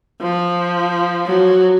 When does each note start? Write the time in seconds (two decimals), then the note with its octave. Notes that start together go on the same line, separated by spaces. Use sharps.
0.22 F3
1.26 F#3